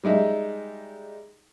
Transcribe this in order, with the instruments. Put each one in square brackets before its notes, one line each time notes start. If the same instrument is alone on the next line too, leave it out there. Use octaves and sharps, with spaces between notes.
[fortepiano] G3 G#3 D#4 E5